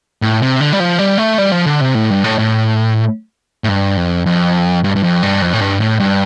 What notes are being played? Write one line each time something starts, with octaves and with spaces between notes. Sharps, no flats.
A2
C3
D3
G3
F3
G3
A3
G3
F3
D3
C3
A2
G2
A2
A2
A2
G2
F2
F2
G2
G2
F2
G2
F2
A2
G2
A2
G2